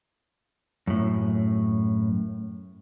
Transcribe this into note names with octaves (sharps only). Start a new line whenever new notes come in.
F#2 A2